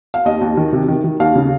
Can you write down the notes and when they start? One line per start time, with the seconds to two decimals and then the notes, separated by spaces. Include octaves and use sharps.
0.14 F5
0.25 D#2 D#5
0.41 D#2
0.57 D#3
0.73 C3
0.88 D#3
1.04 D#3
1.20 D#2 F5
1.36 C#3